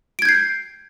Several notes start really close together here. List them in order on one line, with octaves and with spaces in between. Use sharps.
D7 G#6 G6 C7